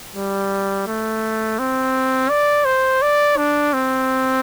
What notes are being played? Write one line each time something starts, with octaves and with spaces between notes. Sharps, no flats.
G3
A3
C4
D5
C5
D5
D4
C4